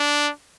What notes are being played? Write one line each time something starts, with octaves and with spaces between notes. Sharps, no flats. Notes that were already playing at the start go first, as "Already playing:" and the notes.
Already playing: D4